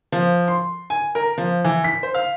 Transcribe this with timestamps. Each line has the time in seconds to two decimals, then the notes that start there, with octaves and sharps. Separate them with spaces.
0.12 F3
0.48 C6
0.90 G#5
1.15 A#4
1.38 F3
1.64 E3
1.84 B6
2.03 C5
2.14 F5